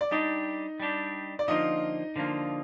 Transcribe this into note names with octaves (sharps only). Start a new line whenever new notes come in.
D5
G3 D4 D#4 G4 D#5
G3 D4 G4
D5
D3 F3 A#3 D#4 F4 D#5
D3 F3 A#3 F4